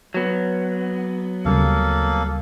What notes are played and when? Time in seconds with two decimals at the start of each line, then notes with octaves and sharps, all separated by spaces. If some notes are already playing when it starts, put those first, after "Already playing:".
0.14 F#3 B3
1.45 D2 C#3 G3 A#3 A4 F5